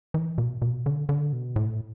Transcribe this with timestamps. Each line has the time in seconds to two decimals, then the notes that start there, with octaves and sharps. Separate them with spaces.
0.14 E3
0.38 B2
0.62 B2
0.86 D3
1.09 D3
1.33 B2
1.56 A2